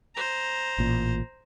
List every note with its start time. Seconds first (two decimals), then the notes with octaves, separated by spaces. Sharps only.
0.15 C5 A#5
0.78 A1 A#2